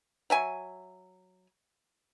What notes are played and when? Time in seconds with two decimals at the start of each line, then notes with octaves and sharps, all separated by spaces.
0.30 F#3 E5 G#5